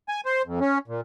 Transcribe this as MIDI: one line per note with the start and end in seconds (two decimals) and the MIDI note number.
0.09 0.21 80
0.26 0.42 72
0.46 0.59 41
0.61 0.78 61
0.88 1.01 46